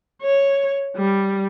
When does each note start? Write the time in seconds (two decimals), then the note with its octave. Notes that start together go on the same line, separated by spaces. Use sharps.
0.22 C#5
0.96 G3